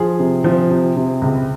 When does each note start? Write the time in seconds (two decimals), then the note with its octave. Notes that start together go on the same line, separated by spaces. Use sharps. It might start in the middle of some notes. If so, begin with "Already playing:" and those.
Already playing: F3 G#4
0.19 C3
0.44 F3
0.70 C3
0.96 C3
1.22 C#2